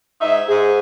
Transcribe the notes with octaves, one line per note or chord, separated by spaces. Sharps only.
G#2 D#4 E5
G#2 G#4